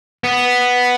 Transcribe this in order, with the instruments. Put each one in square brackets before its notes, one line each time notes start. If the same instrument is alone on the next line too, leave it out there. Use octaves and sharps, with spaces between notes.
[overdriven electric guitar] B3